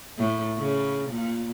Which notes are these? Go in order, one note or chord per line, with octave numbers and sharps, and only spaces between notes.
A2
C#3
A#2